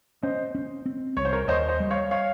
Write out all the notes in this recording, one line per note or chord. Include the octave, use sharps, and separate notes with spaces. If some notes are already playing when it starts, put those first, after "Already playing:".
C#4 C5 D#5
C#4
C4
C2 C#5
C5
A#4 C#5
D#2 C5 D#5
C5 D#5
G3
C#5 F5
C#5 F5